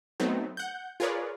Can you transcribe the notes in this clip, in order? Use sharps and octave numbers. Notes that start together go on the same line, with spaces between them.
F#3 A3 B3 C4 D#4
F#5 G6
F4 G#4 A#4 B4 C#5 D5